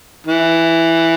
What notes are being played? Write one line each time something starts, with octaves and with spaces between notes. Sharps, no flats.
E3